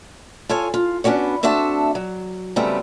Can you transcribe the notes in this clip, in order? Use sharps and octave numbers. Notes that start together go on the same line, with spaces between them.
F4 A4 C#5 G#5
F4
B3 C#4 D4 F#4 C#5
A3 C4 D4 F#4 E5 A5
F#3
C#3 F#3 G3 A3 B3 C4